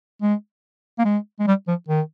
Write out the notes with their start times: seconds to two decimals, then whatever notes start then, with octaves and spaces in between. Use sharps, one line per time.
0.22 G#3
0.99 A#3
1.05 G#3
1.40 G#3
1.47 G3
1.68 F3
1.88 D#3